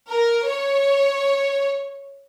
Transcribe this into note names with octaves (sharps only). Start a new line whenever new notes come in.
A#4
C#5